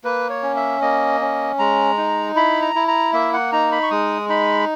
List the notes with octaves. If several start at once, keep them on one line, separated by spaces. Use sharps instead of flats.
A#3 B4
C#5
C#4
E5
A#3 D#5
C#4
G#3 A#5
D#4
E4 B5
A#5
E4
A#5
A#3 E5
F#5
D#4 A#5
B5
C#6
G#3 D#6
D#4 B5